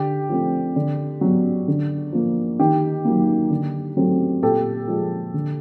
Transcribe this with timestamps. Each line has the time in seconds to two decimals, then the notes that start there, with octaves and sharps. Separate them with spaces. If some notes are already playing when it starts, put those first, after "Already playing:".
Already playing: D3 G4
0.29 F3 A3 C4
0.76 D3
1.21 F#3 B3
1.68 D3
2.13 F3 A#3
2.59 D#3 G4
3.04 F#3 A#3
3.50 D3
3.97 F#3 A3 C4
4.42 A#2 G4 A4
4.88 F3 G#3
5.34 D3